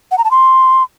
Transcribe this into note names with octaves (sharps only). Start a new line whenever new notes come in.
F#5
A#5
A5
C6